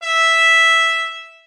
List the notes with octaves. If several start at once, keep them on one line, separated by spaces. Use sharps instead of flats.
E5